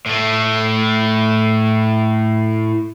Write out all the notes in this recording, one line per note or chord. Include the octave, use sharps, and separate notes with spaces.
A2 A3